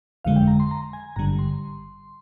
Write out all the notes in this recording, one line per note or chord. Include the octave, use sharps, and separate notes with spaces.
G1 F2 D3 G#3 F5
G5
A#5
C6
A#5
G#5
G#1 G2 D3 G3 A#5
C6